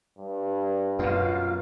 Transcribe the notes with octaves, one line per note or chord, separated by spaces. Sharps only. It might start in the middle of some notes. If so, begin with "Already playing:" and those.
G2
F#2 B2 B3 F4 F5